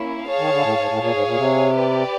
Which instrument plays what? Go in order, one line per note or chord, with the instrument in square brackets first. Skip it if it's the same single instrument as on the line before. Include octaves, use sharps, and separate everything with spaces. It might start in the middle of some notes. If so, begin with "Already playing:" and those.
Already playing: [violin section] A#3 C#4 E4
G#4 C#5 F5 A5
[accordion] D#3
D3
A2
G#2
A2
[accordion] A#2 [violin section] G#4 C#5 F5
[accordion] G#2
A#2
C3
[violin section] G4 B4 D5